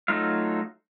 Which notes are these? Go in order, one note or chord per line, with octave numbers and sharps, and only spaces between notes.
F#3 A3 D#4 F4 F5